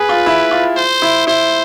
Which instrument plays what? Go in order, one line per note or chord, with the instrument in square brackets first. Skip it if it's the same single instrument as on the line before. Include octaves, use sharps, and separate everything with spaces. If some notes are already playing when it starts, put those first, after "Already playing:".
Already playing: [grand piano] G#4 [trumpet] B4
[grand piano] F4
E4
F4
[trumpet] C5
[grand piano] E4
[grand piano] E4 [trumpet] C5